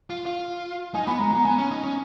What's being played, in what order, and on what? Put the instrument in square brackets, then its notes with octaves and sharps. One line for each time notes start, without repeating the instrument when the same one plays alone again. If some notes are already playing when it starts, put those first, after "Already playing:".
[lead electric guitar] F4
F4
[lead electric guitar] D#4 [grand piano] G#5
[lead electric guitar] B3 [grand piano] B5
[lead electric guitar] G#3 [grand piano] A#5
[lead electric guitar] B3 [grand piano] A#5
[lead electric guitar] B3 [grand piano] G#5
[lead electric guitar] C#4
D#4
C#4